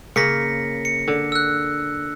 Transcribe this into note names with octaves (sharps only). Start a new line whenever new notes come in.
C#3 A#3 A#6 B6 C#7
C#7
D3
E6 F#6